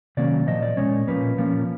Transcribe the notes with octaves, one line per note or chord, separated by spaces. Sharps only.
C3 D#3 F#3 A#3 C#4 D5
A#2 F3 D#5
D5
A#2 F3 G#3 C#4 C#5
A#2 F3 A#3 C#4 B4
A#2 F3 A#3 C#4